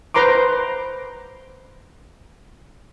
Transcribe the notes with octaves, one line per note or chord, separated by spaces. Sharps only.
B4 C5 A#5 C6 D6